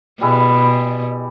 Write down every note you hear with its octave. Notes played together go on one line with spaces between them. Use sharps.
B2 G3 G#3 E4